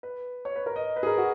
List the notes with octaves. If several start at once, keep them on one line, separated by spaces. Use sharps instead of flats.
B4
C#5
B4
A#4
D#5
B4
G#4
A#4
F#4